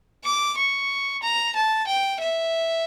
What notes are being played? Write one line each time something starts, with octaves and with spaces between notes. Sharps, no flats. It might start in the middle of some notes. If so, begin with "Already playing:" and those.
D6
C#6
A#5
A5
G5
E5